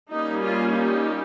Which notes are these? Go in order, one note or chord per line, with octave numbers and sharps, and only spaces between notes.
G3 A#3 C#4 D#4
F4
D#4 G4